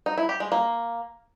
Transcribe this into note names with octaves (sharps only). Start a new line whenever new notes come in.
D#4
E4
G4
G#3
A#3